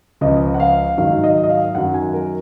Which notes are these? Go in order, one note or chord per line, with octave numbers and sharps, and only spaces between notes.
C#2 C#3 F3 D#5
F#5
F5
G#2 D#3 F#3 F5
D#5
D#5
F5
F#2 D#3 F#3 F#5
G#5
A#4